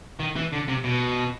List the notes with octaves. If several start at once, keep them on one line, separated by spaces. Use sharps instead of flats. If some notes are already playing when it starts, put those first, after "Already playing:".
D#3
E3
D3
C3
B2